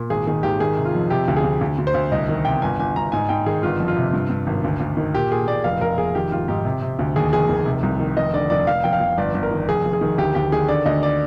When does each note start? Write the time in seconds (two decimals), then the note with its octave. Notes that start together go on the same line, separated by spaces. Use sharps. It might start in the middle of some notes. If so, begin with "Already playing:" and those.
Already playing: A#2
0.10 G#1 G#4
0.27 D#3 G#4
0.43 G#1 G4
0.60 D#3 G#4
0.77 C3
0.85 F4
0.95 F2
1.10 C3 G4
1.28 D2
1.37 G#4
1.44 D2
1.61 D2
1.78 D2
1.87 C5
1.94 D2
2.12 C2 D#5
2.29 D#3
2.45 C3 G5
2.62 G1 G#5
2.79 G1 G#5
2.96 G1 A#5
3.12 G#2 G#5
3.29 G#2 G5
3.46 D#3 G#4
3.63 G1 F4
3.80 F2
3.88 F4
3.97 C3
4.13 G2
4.30 G2
4.47 G#1
4.64 D2
4.80 D2
4.97 D#3
5.14 A#2 G4
5.31 A#2 G#4
5.48 A#2 D5
5.64 F1 F5
5.81 F1 A#4
5.98 F1 G#4
6.15 D#3 G4
6.32 G#1 F4
6.48 G#2 G4
6.65 C3
6.82 C3
6.99 D2
7.16 D#2 G#4
7.33 F1 G#4
7.49 D#3
7.66 C3
7.83 C2
8.00 D#3
8.17 F1 D#5
8.33 D3 D5
8.50 F1 D5
8.67 F1 F5
8.84 F1 G5
8.93 F5
9.00 F1
9.18 G1 D5
9.34 G1
9.43 A#4
9.51 D#3
9.69 F1 G#4
9.85 F1
9.93 G#4
10.01 D#3
10.18 D2 G4
10.35 D2 G4
10.52 D#3 G#4
10.68 D3 D5
10.86 D2 D#5
11.03 D5